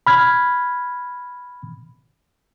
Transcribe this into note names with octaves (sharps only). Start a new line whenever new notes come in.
B5 F6 G#6